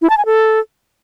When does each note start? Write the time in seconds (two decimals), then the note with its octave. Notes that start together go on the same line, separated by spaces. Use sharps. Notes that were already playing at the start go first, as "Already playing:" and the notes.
0.02 E4
0.10 A5
0.18 G#5
0.26 A4